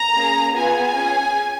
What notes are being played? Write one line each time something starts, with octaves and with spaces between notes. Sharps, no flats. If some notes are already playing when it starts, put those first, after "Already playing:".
Already playing: A#5
A#3 C#4 G#4
B3 F4 G#4 G#5
C#4 G#4